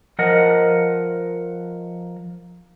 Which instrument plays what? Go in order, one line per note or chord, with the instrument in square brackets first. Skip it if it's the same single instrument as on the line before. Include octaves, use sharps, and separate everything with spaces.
[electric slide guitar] F3 A#4 D#5 F#5